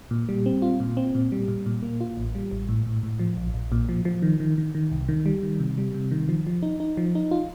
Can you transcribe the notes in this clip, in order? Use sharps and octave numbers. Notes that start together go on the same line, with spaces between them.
A#2
G3
C4
F4
A#2
C4
A#2
G3
A#2
A#2
A#3
F4
A1
G3
A1
A2
A2
A2
F3
A#1
A#1
A#2
F3
F3
D#3
D#3
D#3
D#3
C2
D#3
G3
D#3
C3
G3
C3
D#3
F3
F3
D#4
D#4
F3
D#4
F4